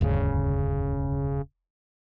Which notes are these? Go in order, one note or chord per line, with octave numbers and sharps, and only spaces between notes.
E1 D2 G2 C#3